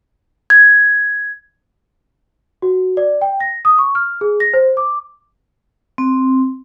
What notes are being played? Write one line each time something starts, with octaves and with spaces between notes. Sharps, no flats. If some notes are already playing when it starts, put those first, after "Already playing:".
G#6
F#4
D5
G5
A#6
D#6
C#6
F6
G#4
A#6
C5
D6
C4